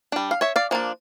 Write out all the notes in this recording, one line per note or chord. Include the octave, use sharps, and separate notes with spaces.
G3 D4
F5
C#5 E5
D5 F5
F3 A#3 D4